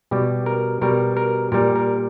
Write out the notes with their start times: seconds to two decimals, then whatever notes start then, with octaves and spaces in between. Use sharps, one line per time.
0.11 B2 G3 G4
0.46 A#4
0.81 B2 G3 A#4
1.17 A#4
1.52 A#2 G3 A#4
1.76 A#4